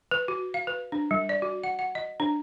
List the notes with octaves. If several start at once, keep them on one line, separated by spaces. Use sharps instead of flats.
B4
F#4
F5
B4
D4
G3
D5
F#4
F#5
F#5
D#5
D4